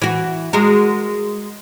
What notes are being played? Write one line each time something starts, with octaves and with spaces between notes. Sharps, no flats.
E3 F#4
G#3 F#4 A#4